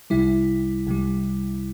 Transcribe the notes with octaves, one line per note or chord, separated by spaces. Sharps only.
C2 C3 G3 E4
C2 C3 G3